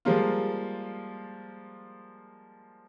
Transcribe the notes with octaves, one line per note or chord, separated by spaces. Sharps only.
F3 G3 G#3 A#3 F4